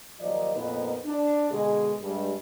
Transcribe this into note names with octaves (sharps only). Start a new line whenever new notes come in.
D#2 F3 F#3 D5 D#5
F2 A#2 B3 D#4 B4
D4
B2 D3 G#3 G#4
G2 G#3